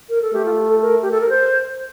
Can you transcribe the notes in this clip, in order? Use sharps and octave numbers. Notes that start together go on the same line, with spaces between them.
A#4
A4
A3 G4
F4
A4
A#4
G4
A4
A#4
C5